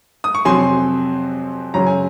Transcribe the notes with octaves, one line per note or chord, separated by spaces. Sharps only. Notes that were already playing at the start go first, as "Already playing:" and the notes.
D#6
C#6
F2 C3 F#3 C4 G#5 C6
F#2 C#3 F#3 C#4 A#5
G#5